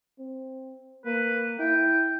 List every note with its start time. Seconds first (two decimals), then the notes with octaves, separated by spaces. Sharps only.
0.19 C4
1.05 A#3 B4
1.59 E4 G5